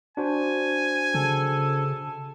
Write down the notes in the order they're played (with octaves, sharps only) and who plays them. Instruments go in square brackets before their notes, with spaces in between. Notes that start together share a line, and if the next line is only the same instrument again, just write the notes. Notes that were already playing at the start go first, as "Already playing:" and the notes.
[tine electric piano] D4 F#4 C5 [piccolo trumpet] G#5
[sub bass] C#3 [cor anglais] A4